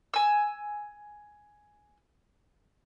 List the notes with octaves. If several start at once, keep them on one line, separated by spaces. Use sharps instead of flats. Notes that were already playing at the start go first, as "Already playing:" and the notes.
G#5 E6